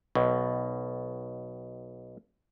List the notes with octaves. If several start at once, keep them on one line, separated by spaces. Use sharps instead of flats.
B1 B2